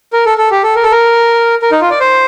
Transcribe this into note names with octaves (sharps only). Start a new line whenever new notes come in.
A#4
A4
A4
G4
A4
A#4
A4
A#4
A#4
D#4
F4
D5
C5